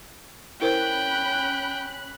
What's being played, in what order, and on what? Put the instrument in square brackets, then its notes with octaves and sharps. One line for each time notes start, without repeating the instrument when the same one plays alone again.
[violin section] C#4 B5 F#6 [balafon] E4 A#4 C5 [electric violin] G5